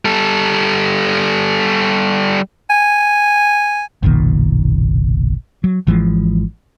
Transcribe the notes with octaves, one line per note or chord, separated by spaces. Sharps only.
G3 A4
G#5
F#1 B1 A#2 D#3
F#3
G#1 E3 F3 G#3